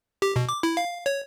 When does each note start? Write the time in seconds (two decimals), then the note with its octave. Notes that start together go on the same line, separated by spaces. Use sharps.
0.22 G4
0.36 B2
0.49 D6
0.63 E4
0.77 F5
1.06 C#5